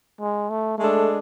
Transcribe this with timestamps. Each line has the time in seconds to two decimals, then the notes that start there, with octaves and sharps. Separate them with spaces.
0.21 G#3
0.50 A3
0.78 G#3 A3 D4 A4